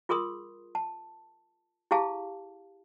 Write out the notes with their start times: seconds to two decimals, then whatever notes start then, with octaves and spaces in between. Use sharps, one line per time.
0.09 F4 G#4 A#4 C6 D#6
0.75 A5
1.91 E4 G4 G#4 F5 A5